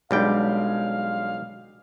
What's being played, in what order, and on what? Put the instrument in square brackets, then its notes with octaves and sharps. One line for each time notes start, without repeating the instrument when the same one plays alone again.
[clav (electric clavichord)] B1 G3 G5 [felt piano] G#3 D4 [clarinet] F5